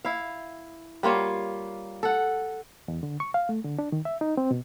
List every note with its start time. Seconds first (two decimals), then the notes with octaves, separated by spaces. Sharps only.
0.05 E4 F5
1.03 G3 A#3 F4 C#5
2.03 A4 F#5
2.88 E2
3.03 D3
3.20 C#6
3.34 F5
3.49 A3
3.64 D3
3.79 D4
3.92 D#3
4.05 E5
4.21 D#4
4.37 C4
4.51 B2